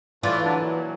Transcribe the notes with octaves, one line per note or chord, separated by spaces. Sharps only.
A2 E3 F4 D5
D3 F#3 D4
A#2 F#3